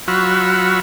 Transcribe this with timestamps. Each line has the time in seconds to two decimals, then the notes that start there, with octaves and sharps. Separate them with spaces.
0.08 F#3 F4 F#4 B5 C#6 E6